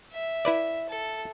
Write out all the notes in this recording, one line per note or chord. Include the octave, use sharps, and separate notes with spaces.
E5
E4 B4 D5
A4